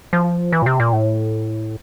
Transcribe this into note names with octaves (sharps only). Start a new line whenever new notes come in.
F3
E3
A#2
C3
A#2
A2